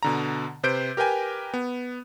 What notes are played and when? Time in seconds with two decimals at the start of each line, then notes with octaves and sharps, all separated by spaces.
0.03 B2 D3 A#5
0.63 C3 B4 C5 G6 D7
0.97 G4 A#4 B4 G5 G#5
1.54 B3